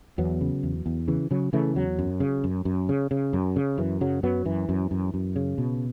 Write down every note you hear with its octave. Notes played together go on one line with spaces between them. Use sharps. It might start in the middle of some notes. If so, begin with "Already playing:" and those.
E2 F#3 B3
C#3
E2
E2
C#3 E3
C#3 F#3
C#3 E3 A3
E2 F#3
F#2
C#3
F#2
F#2
C#3
C#3
F#2
C#3
F#2 E3
C#3 F#3
F#2 F#3 B3
F#2 E3
F#2
F#2
F#2
C#3
B2